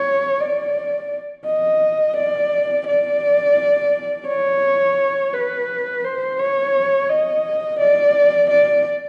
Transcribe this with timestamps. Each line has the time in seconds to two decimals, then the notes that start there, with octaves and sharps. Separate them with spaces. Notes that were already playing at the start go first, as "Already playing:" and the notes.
Already playing: C#5
0.41 D5
1.46 D#5
2.17 D5
2.87 D5
4.28 C#5
5.34 B4
6.04 C5
6.39 C#5
7.10 D#5
7.80 D5
8.50 D5